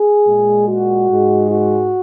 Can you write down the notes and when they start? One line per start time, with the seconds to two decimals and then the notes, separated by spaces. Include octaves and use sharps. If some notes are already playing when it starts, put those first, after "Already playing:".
Already playing: G#4
0.26 A#2 G#3
0.68 F#4
1.09 G#2 G#3
1.50 F#4